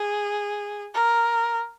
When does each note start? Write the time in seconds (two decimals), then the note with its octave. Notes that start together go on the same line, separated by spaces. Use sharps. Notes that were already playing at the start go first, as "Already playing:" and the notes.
Already playing: G#4
0.95 A#4